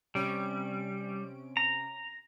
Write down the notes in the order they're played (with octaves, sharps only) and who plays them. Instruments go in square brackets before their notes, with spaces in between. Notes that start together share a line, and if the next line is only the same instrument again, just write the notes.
[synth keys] C3 C#4 D7 [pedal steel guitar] G3
[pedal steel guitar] A#5